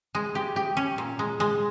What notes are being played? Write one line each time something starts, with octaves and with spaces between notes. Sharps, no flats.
G#3
G4
G4
C#4
A#2
G#3
G#3